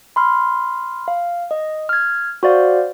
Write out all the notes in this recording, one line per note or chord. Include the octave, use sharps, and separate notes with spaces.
B5 C6 F6
F5
D#5
F6 G#6
F#4 C5 D5 F5